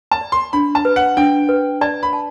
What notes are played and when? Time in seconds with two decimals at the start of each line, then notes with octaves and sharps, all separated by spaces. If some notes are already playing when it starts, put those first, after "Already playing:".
0.11 A5
0.21 D5
0.32 C6
0.53 D4 B5
0.75 A5
0.85 B4
0.96 F#5
1.17 D4 G5
1.49 B4
1.81 D5 A5
2.03 B5
2.13 A5